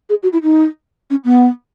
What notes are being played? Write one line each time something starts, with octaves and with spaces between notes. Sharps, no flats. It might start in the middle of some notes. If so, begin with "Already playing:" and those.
G#4
F#4
E4
D#4
C#4
B3